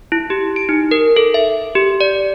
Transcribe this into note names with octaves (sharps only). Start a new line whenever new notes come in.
E4
G4
D7
D#4
A#4
A4
E5
G4
D5